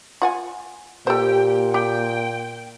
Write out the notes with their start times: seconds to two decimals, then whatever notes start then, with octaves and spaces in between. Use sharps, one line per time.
0.22 F4 F#5 G#5
1.07 A#2 G4 A4 C5 G5
1.74 G4 G5